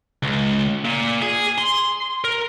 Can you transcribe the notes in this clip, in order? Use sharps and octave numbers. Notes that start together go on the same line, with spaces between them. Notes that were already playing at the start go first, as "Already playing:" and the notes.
C#2
A#2
G#4
C6
A#4